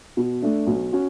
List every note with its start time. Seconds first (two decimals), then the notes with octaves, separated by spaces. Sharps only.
0.17 B2
0.42 A3 D4
0.67 B1
0.93 C#4 F#4